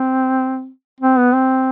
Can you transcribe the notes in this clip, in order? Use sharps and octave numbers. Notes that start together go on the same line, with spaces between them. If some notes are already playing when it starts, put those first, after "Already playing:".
Already playing: C4
C4
B3
C4